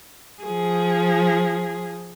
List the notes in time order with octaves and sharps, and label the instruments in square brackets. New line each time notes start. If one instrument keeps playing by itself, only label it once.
[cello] F3 G#4